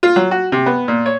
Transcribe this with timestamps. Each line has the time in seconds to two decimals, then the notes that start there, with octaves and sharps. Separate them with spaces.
0.03 F4
0.16 F#3
0.31 F#4
0.52 C3
0.66 B3
0.88 A#2
1.06 C#5